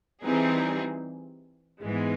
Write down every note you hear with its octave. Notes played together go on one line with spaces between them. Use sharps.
E3 G3 C4 D#4 G#4
G#2 E3 G#3 B3